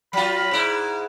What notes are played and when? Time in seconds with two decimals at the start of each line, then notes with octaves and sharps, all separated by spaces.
0.13 F#3 F4 B5
0.51 G#2 E4